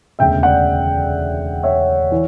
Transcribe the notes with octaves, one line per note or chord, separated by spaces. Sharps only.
E1 D2 C#3 E5 G5
D5 F#5
C#5 E5
E3